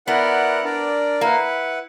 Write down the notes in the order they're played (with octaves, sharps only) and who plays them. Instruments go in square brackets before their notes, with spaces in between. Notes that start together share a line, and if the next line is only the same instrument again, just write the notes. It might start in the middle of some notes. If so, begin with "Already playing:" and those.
[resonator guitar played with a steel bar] B3 [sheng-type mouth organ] E4 A#4 D5 F#5
[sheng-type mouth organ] D4 A#4 D5
[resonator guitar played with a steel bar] A#3 [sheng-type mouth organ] E4 B4 F#5